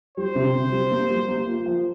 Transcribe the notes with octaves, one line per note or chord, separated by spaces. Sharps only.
G3 C5
C3
C3
G3
A#3
G3
A#3
F4
F3